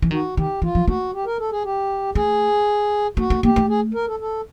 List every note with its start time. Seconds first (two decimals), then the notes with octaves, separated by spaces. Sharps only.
0.02 E3
0.11 D#3 F#4
0.37 D#3 G4
0.62 E3 F4
0.75 F3
0.88 A3 F#4
1.13 G4
1.26 A#4
1.39 A4
1.51 G#4
1.64 G4
2.15 A3 G#4
3.17 A3 F#4
3.30 A3
3.43 A#3 G4
3.56 A3
3.69 G#4
3.94 A#4
4.07 A4
4.20 A4